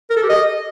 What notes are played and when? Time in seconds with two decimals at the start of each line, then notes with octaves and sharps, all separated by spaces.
0.10 A#4
0.17 A4
0.23 G4
0.29 D#5